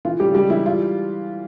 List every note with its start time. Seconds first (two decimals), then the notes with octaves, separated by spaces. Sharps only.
0.05 E3 F4
0.20 C#3 G3 G4
0.34 G3 G#3 G4
0.50 E3 E4
0.66 G3 F4